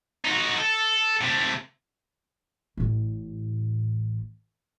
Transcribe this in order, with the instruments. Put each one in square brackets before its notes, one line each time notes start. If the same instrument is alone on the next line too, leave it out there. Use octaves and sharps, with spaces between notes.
[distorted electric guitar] D#4 F#4
A4
C3 A3
[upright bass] A1 A2